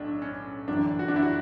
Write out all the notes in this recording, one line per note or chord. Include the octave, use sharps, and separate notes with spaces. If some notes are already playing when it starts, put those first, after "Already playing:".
Already playing: B1 A2 D4
C#4
G1 F#2 E3 D4
F#4
D4
E4
F#4